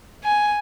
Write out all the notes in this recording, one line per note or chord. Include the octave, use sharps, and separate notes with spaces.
G#5